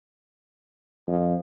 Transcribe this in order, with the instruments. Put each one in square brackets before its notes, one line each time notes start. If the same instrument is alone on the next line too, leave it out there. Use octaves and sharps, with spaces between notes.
[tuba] F2